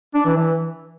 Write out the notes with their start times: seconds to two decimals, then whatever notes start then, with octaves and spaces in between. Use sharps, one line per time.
0.14 D4
0.25 E3
0.36 E3